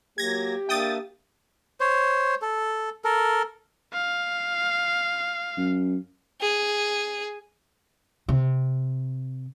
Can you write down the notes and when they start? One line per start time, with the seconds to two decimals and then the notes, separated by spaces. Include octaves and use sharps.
0.18 F#3 A#3 G4 G#6 A#6
0.69 A#3 D4 E5 G5 D#6 A6
1.80 C5 C#5
2.42 A4
3.04 A4 A#4
3.94 F5
5.57 F#2
6.41 G#4
8.29 C3